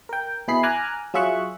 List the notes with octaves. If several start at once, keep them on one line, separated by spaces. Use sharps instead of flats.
A#4 G5
B2 E4 G#4 B5 C7
G#5 A#5 D6 F6 F#6
F#3 F4 G#4 E5 C#6 F#6